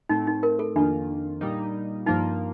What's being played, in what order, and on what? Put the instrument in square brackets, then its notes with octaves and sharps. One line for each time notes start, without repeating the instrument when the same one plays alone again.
[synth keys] A2 A3 C4 [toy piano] D#4
[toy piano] D#4
A#4
A4
[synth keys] F2 D#3 A#3 F4 [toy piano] D4
[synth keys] A#2 G3 A#3 D#4
[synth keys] G2 F3 A#3 F4 [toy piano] D#4